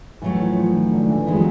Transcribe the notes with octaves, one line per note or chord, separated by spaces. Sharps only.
A2 E3 F#3 A3
F3
F3
D#3
D3
E3
E3 F3 G#3 B3 E4
F#3